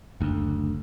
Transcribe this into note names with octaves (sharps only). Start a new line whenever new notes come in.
F#1 D2